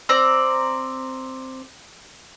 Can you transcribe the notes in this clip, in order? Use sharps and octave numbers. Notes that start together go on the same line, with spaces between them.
C4 D5 A#5